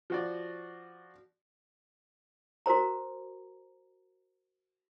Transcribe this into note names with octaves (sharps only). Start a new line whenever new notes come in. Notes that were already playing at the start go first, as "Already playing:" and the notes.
F3 F#4 D5
F#4 A#4 C5 A#5